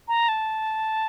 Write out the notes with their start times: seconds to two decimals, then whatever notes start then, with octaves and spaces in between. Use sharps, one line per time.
0.08 A#5
0.28 A5